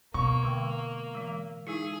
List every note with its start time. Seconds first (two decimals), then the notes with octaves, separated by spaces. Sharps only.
0.14 B2 A#3 C#6
0.43 D3 G#3 G5
1.15 E3 G#3
1.67 G#3 D#4 E4 G#4